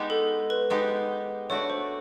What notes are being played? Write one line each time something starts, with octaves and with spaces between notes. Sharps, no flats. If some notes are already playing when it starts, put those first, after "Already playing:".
Already playing: G#3 B3 D#4 G4
A4
B4
G#3 B3 D#4 G4
A3 D4 F#4 B4 C#5 D5
C5